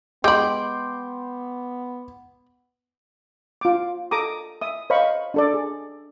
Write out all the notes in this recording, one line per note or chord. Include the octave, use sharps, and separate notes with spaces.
G#3 B3 G5 B5 C6 D6
F4 D6
A4 A#5 D6 D#6
E5 D#6
C5 C#5 D#5 F5 B5 C#6
D4 A4 D5
G#4